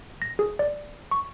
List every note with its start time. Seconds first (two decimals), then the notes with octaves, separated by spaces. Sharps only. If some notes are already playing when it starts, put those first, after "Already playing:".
0.22 A#6
0.39 G#4
0.59 D5
1.11 C#6